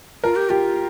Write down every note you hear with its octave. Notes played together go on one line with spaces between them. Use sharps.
F4 A#4
G4
F4 G4